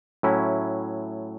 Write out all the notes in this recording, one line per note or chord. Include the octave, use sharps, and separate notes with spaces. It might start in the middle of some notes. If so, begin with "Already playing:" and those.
A2 F#3 C#4 E4